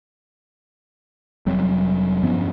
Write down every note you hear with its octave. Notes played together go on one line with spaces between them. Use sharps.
F1 F#3 G3 C4
G2 F3 B3 C#4